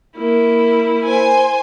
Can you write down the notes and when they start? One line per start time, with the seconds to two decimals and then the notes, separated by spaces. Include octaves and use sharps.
0.17 A#3 E4
1.03 C5 G#5